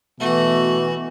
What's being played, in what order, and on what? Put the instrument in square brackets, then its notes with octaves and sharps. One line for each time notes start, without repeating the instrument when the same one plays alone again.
[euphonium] B2 [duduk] E3 [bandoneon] A3 [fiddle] F#4